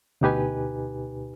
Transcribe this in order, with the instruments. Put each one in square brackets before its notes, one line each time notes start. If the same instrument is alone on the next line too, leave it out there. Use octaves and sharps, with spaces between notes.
[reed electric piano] D2 B2 D#4 G4 B4 G#5